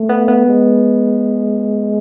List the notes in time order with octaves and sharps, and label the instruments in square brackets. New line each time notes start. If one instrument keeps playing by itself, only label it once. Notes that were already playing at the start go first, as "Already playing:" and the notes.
Already playing: [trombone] A3
[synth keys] B3
B3
[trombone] G#3